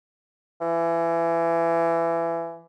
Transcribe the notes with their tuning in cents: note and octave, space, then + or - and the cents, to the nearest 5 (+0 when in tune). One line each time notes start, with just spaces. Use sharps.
E3 +25